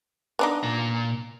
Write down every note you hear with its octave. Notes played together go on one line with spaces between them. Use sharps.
B3 D4 D#4
A#2 A#5